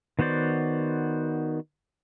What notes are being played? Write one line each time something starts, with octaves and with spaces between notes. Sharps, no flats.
D#3 B3 F#4 C5 D5